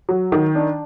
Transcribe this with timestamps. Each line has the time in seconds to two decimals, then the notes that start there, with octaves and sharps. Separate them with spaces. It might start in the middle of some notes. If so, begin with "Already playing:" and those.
0.09 F#3
0.32 D#3
0.55 D4